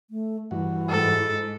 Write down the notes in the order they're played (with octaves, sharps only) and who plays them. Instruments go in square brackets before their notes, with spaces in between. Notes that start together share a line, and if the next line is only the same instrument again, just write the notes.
[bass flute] A3
[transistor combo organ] G2 E3 F#4 [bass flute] E4
[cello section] G#2 [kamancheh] A4